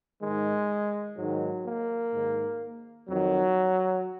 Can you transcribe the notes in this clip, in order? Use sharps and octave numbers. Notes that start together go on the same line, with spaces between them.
G#2 D#3 G#3
G#2 D#3 F#3
A#3
G#2 D#3
F2 D#3 F#3